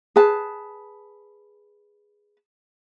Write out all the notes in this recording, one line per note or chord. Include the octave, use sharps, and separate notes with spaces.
G#4 B4 A5